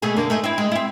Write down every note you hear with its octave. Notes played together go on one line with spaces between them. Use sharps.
B2 A3 G#4
F#2 D3 A#3
A3 D#4 G#4
C4 E4
G#3
C4 E4